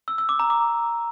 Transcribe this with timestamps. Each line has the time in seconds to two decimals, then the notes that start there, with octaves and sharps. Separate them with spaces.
0.08 E6
0.18 E6
0.29 D6
0.39 A#5
0.50 D6